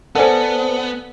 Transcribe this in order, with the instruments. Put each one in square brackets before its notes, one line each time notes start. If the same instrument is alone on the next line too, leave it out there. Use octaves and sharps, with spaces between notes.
[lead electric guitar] B3 [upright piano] A4 D5 G#5 [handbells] C5 F#5